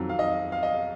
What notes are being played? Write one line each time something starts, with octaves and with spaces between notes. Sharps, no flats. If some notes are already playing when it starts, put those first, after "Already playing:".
Already playing: F2 D#3 F#3
F5
D#5
F5
D#5